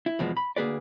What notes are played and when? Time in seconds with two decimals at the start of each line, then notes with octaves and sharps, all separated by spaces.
0.06 E4
0.19 E2 B2 F3 G#3
0.37 B5
0.56 D2 A#3 G#4 B4 D5